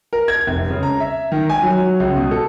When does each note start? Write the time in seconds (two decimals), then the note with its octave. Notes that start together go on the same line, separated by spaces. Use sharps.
0.13 A#4
0.28 G#6
0.47 F1
0.70 C#3
0.83 A#5
1.00 E5
1.32 D#3
1.50 G#5
1.63 F#3
2.00 C#2
2.16 B2
2.31 A4